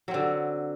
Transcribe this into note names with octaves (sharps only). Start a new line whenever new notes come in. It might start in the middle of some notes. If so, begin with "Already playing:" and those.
D3 F#3 C4